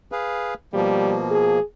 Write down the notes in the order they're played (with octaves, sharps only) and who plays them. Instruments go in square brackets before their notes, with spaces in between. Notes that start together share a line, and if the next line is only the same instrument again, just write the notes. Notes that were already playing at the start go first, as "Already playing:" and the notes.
[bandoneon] G#4 B4 F5
[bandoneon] B2 F3 A#3 [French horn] G3
[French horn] G#4